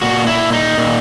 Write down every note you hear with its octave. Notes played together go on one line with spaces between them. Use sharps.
A#2 F#4
E4
D#4
A#2